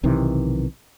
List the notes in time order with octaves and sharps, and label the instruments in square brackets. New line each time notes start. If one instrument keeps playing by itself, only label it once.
[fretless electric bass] B1 C3 D#3 E3